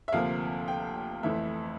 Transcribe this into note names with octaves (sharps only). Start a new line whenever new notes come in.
E5
D2 C3 F3 A#3 F5
G5
F2 E3 A3 E5